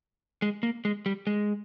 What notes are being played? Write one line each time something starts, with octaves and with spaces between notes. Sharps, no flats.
G#3
A#3
G#3
G3
G#3